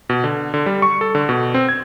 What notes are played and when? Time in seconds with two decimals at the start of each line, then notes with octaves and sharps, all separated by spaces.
0.09 B2
0.24 D3
0.54 D3
0.66 G3
0.82 C#6
1.01 A4
1.15 D3
1.29 B2
1.54 C4
1.69 G#6